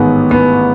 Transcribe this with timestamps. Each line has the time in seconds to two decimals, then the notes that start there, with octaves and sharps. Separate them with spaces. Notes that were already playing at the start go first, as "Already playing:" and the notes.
Already playing: A1 G#2 D#3 B3
0.31 B3